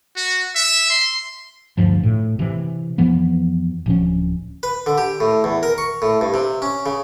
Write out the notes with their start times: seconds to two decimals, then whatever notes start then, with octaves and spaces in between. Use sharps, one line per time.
0.16 F#4
0.56 E5
0.90 C6
1.77 D2 G2 F3
2.03 A2
2.39 C3 E3
2.98 F2 E3 F3 B3
3.86 D1 F3 C#4
4.63 B4
4.86 D3
4.98 G4
5.20 A2
5.44 E2
5.63 A#4
5.78 C#6
6.02 A2
6.21 G2
6.34 C3
6.62 C#4
6.86 C#3